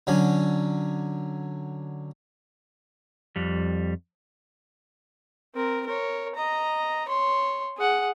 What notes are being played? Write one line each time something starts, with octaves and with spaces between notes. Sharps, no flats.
D3 F#3 C#4
F2 G3
C4 A#4
A#4 C#5
D#5 A#5
C#5 C6
G#4 F#5